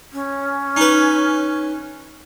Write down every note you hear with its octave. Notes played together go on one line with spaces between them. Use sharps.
C#4
D#4 B4